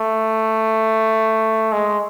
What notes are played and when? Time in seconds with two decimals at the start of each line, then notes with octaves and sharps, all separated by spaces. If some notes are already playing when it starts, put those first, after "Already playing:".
Already playing: A3
1.72 G#3